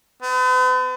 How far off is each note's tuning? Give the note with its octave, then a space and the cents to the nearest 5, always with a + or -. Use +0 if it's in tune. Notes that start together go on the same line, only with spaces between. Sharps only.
B3 +45